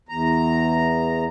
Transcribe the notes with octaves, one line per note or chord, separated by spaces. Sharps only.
E2 A#5